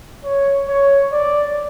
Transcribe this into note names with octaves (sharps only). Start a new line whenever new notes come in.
C#5
C#5
D5